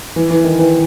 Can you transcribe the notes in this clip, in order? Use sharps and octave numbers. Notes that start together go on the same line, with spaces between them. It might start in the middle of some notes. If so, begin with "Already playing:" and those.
E3
E3
D#3
E3